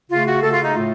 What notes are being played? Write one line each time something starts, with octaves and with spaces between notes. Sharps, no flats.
C#3 A3 F4
F#4
C#3 A3 A4
F4
D#4
A2 A3 F4